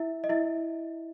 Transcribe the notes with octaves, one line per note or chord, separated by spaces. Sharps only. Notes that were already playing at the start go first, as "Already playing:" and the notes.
Already playing: E4 E5
D#5
E4 E5